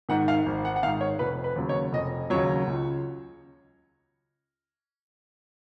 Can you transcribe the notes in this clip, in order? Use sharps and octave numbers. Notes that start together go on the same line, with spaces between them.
G#2 D#3 F#5
F5
G#1
F#5
F#5
G#2 D#3 F5
C#5
F1 B4
B4
D#2 C#3 F#3
C#5
F1 D#5
D#2 C#3 F#3 C#5
C#2